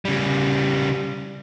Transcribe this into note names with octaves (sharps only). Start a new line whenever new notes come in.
C#3 G3